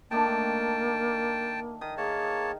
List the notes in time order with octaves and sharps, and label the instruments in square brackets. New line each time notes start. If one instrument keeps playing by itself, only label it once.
[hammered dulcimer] D#3 A3 D4 [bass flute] A#3 [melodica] G5 A5
[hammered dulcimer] D#3 [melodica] D#6
[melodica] A#3 C#5 A5 [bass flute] G#4